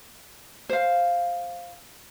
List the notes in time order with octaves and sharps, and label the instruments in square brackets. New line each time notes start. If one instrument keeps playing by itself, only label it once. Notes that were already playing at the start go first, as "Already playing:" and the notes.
[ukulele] C5 F5